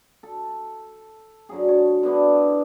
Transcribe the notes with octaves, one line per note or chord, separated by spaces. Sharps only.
A4
D3 F#3 G#4
C#5 A5
D3 B3 D4 E4